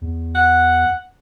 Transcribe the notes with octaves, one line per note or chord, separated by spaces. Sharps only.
E2
F#5